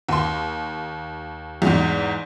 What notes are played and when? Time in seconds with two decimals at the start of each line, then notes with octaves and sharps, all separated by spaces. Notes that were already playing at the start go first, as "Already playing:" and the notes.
0.09 D#2 C6
1.62 E2 G#2